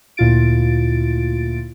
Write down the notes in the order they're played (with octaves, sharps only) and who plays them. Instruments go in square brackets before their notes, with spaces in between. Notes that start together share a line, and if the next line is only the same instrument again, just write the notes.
[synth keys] D2 A#2 E4 F4 A6 D7